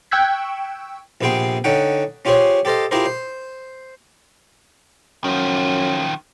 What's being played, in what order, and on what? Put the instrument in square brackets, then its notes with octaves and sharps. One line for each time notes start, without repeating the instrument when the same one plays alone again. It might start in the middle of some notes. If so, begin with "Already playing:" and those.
[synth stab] G5 C#6 E6 F#6 G#6 B6
[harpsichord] A#1 C3 B3 G#4 G5 C6
D3 C#4 D#4 F#5 G5
C#4 F4 G4 G#4 C5 C#5
G4 A4 C5 D#5 F5
E4 F4 G4 G#4 A#4 C5
C5
[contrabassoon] F#2 [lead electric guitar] D#3 F3